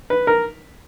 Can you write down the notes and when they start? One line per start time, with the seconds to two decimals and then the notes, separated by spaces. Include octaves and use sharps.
0.10 B4
0.27 A#4